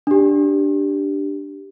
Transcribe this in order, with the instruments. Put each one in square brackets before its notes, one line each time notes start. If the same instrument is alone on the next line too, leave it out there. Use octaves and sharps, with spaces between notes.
[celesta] D4 G4